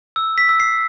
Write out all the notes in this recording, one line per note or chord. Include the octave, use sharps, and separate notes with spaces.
E6
B6
E6
C7